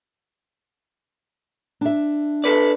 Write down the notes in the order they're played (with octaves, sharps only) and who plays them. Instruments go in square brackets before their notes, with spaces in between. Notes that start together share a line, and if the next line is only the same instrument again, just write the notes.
[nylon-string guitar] D4 E5
[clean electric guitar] A4 B4 D5